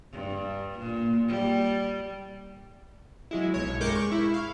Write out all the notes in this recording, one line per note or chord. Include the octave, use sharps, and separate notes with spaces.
G2
A#2
G3
F#3 G#3 E4
B1 C#5
G2 G#3 A#4 D6 G6 C#7
C#6
E4
F5